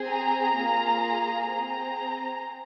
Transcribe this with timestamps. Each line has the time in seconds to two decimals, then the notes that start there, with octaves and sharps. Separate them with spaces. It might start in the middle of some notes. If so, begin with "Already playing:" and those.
Already playing: C4 G#4
0.09 A#5
0.56 A#3 F4 G#4
1.49 C4 G#4 A#5